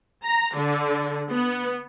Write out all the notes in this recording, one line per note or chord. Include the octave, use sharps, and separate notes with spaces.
A#5
D3
B3